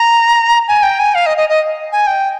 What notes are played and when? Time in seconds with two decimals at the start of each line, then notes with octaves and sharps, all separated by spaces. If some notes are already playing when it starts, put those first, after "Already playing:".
Already playing: A#5
0.68 G#5
0.83 G5
0.99 G#5
1.14 F5
1.26 D#5
1.37 D#5
1.49 D#5
1.92 G#5
2.07 G5